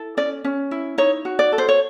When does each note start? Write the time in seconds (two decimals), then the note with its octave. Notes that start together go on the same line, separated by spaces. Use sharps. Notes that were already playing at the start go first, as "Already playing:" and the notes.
Already playing: E4 A4
0.17 C#4 D5
0.44 C#4
0.71 E4
0.98 D#4 C#5
1.25 F#4
1.39 D5
1.52 A4
1.58 C5
1.69 C#5